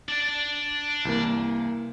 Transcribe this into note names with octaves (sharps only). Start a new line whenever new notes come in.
D4 D5
C2 E3 A#3